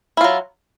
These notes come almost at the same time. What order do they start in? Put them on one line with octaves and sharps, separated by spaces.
E4 F4 F#3